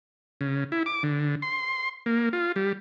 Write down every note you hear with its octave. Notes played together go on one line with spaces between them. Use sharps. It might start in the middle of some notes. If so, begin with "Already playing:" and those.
C#3
E4
D6
D3
C6
A#3
F4
G3